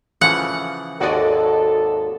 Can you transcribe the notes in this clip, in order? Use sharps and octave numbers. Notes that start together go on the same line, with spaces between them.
C#3 E3 F3 F#5
G#1 D#2 G#3 F#4 A4 D5 D#5